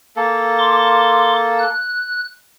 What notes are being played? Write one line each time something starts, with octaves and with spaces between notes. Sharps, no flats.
A#3 A4
C6 D6
F#6